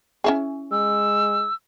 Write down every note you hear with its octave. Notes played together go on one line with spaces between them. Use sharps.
C#4 E4 G#4
G#3 E6